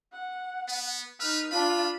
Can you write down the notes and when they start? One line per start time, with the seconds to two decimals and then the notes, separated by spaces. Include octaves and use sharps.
0.12 F#5
0.68 B3
1.20 D#4 B4 F6
1.51 D4 F4 B5